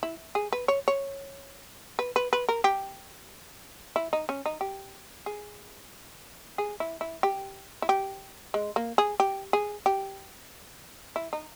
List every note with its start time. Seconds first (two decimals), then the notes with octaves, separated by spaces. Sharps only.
0.03 E4
0.35 G#4
0.52 B4
0.68 C#5
0.88 C#5
1.99 B4
2.16 B4
2.33 B4
2.49 A#4
2.64 G4
3.96 E4
4.13 D#4
4.29 C#4
4.46 D#4
4.61 G4
5.26 G#4
6.58 G#4
6.80 E4
7.01 E4
7.23 G4
7.82 E4
7.89 G4
8.54 G#3
8.76 A#3
8.98 G#4
9.20 G4
9.53 G#4
9.86 G4
11.16 E4
11.33 D#4